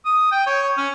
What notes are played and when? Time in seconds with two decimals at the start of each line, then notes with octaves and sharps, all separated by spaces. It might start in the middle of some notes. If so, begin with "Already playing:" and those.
0.05 D#6
0.31 G5
0.47 C#5
0.77 C#4